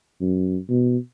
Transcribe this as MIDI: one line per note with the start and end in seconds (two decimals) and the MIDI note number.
0.21 0.57 42
0.69 0.97 47